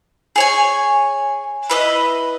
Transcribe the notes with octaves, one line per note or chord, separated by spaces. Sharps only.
G#4 C#5 G#5
E4 B4 D#5